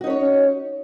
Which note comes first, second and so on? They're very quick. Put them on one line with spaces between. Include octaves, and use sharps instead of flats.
F#4 D#4 C#4 C#5